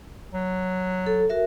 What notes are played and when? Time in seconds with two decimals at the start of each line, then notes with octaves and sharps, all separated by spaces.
0.34 F#3
1.07 A4
1.30 F#4 A#4 E5